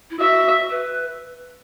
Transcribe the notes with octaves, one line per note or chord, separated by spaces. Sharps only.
E4
F#4 E5
B4